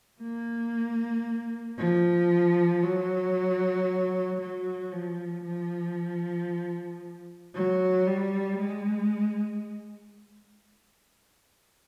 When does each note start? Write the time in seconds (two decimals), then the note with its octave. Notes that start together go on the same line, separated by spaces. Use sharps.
0.22 A#3
1.78 F3
2.83 F#3
4.41 F#3
4.93 F3
5.45 F3
7.55 F#3
8.07 G3
8.59 G#3